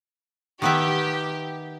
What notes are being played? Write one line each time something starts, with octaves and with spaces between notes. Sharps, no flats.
D#3 B3 G4 E5